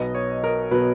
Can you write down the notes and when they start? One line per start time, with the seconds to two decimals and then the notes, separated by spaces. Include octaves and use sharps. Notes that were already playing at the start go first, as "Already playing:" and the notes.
Already playing: B1 B2 F#3 B3 D#5
0.15 C#5
0.44 A#4
0.71 B2 F#3 B3 B4